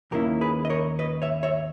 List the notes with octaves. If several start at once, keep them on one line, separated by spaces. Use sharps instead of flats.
D#2 D#3 A#3 C#4 E4 G4 A#4
G#4 B4
D#5
A#4 C#5
B4 D#5
C#5 E5
C#5 E5